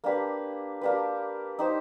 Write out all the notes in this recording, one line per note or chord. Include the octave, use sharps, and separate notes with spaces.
A#3 D4 G4 B4
A#3 D4 G4 B4
D#4 G4 C5